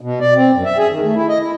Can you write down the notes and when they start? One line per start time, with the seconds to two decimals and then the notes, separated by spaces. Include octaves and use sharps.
0.01 B2
0.21 D5
0.35 C4
0.54 F#2
0.65 E5
0.78 G#4
0.91 D#3
1.03 A3
1.16 E4
1.29 D#5
1.42 E4